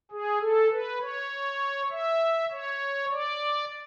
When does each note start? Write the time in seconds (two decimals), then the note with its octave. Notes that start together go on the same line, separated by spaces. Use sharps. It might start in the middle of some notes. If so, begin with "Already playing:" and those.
0.11 G#4
0.41 A4
0.71 B4
1.01 C#5
1.91 E5
2.51 C#5
3.11 D5